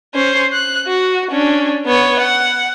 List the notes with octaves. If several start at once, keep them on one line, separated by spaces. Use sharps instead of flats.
C#4 C5
F#6
F#4
C#4 D4
B3 C#5
F#5